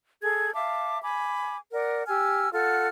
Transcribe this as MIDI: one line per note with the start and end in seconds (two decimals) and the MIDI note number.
0.21 0.53 68
0.21 0.53 69
0.21 0.53 92
0.54 1.00 76
0.54 1.00 77
0.54 1.00 81
0.54 1.00 86
1.02 1.57 80
1.02 1.57 83
1.02 1.57 86
1.72 2.03 70
1.72 2.03 74
1.72 2.03 78
2.07 2.51 67
2.07 2.51 80
2.07 2.51 88
2.07 2.51 89
2.52 2.88 65
2.52 2.88 69
2.52 2.88 78
2.52 2.88 89